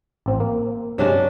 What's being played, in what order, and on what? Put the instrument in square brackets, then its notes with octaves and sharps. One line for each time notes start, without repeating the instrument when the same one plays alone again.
[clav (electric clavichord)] A1 C4
A#3
[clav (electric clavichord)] G2 C3 G#3 [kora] F#3 C#4 D4